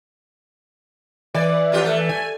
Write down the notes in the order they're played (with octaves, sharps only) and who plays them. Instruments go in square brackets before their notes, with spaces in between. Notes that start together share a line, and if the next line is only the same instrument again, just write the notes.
[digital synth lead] E3 [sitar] D5
[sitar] F2 F4 G4
A3
[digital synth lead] G#5